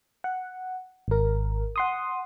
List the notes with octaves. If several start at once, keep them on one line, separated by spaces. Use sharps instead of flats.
F#5
G#1 A#4
F#5 C6 D#6